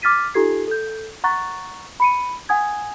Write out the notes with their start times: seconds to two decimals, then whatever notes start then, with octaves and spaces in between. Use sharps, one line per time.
0.02 D6 F6 A6 B6 D#7
0.34 D#4 F4 G4 A4 G#6 C7
0.68 A4 G6
1.24 F#5 A#5 C#6 F#6 A6
2.00 B5 C#7 D#7
2.49 F#5 G#5 D#6 G#6